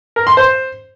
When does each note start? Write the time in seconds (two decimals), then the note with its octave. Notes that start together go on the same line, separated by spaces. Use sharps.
0.16 A#4
0.27 C6
0.37 C5